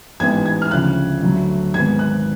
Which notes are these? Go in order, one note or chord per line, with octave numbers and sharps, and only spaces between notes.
A1 G#2 G#3 B3 G#6
G#6
F6
D2 C#3 F3 F#6
D2 D3 F#3 A3
G#1 G#2 G#3 B3 G#6
F#6